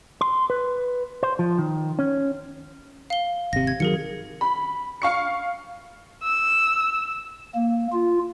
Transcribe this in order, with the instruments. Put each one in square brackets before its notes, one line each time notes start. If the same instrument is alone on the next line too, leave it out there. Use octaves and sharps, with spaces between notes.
[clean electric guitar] C6
B4
C5
F3
D#3
C#4
[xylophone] F5 G7
[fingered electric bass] G#1 C3 [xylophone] A#6
[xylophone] G#6
[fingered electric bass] D#3 F#3 [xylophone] G#4 A#4 C#7
[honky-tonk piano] B5
F5 C#6 C#7
[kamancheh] E6
[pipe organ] A#3
F4